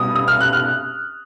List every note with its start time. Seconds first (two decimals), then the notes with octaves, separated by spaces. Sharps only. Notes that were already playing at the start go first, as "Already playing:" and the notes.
Already playing: B2 G3 B3 D#6
0.15 D#6
0.28 F6
0.41 F#6
0.53 F6